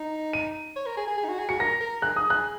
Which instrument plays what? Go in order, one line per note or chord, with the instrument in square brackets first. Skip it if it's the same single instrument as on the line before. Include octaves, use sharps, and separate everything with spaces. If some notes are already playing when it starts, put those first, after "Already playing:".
Already playing: [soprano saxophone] D#4
[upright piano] D#7
[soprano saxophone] C#5
A#4
G#4
G#4
G#4
D#4
F#4
G#4
[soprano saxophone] F#4 [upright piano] C#7
[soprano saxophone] A#4 [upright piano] A#6
[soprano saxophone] A#4
[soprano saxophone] G#4 [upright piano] F#6
[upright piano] D#6
F#6